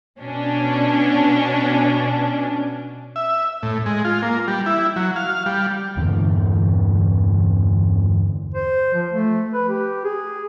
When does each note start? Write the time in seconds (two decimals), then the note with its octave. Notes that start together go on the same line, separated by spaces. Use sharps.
0.20 B2 C#4 D4
3.16 E5
3.63 A2
3.86 G#3
4.05 F4
4.22 A#3
4.48 G3
4.66 E4
4.96 F#3
5.16 F5
5.46 G3
5.96 E2 G2 D3 E3
8.54 C5
8.94 F3
9.12 A3
9.54 B4
9.69 G4
10.05 G#4